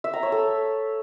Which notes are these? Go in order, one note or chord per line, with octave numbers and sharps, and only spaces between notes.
E5
A#5
C#5
A4